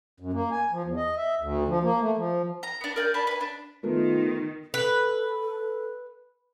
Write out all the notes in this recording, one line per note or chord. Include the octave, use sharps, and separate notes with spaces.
F#2
A#3
G#5
F3
E2
D#5
E5
D2
F3
A#3
A3
F3
A#5
B3 D4
A#4 D5 G#5 G6
D4 G#5 A5 B5
B4 G#5
D4
D#3 A3 B3 F4 A#4
A4 B4